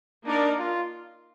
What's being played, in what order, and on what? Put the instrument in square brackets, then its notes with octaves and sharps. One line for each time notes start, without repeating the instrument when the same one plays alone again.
[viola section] A#3 D#4 A#4 D5 [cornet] D4
[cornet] F4